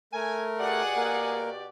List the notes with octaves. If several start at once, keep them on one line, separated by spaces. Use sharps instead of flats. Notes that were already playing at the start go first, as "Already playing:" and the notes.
A3 A#4 G#5
B2 G4 G#4 D5 F#5
A#3 A#4